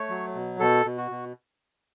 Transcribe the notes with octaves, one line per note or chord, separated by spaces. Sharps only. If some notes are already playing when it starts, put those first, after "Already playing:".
Already playing: A3 C#5
F#3
B2
B2 A4
B2
F#4
B2